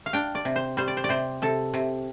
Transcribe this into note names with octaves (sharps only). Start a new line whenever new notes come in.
F5
D4 G5
D5
C3
C5
G3 C5
D5
C5
D5
C3 C5
C3 A4
C3